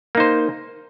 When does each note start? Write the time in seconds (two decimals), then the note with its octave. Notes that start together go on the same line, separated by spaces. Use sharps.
0.15 A#3
0.17 D#4
0.20 C5